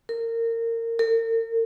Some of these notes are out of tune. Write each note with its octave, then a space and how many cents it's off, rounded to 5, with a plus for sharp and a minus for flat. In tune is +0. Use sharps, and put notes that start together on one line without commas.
A#4 -25
A#4 -40